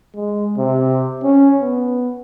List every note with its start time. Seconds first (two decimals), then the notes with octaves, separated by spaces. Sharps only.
0.15 G#3
0.58 C3
1.24 C#4
1.61 B3